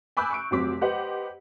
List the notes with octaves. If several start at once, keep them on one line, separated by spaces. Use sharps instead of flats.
G#5 B5 D6 E6 F#6 G6
C#6 F#6 D7
F1 F#3 C4 D6 B6
G4 B4 C5 D#5 F#5